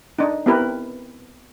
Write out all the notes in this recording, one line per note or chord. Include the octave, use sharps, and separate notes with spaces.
D4 D#4
B3 C4 E4 G4 A#4 B4